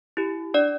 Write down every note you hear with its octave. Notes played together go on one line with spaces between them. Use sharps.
E4 G4
D4 D5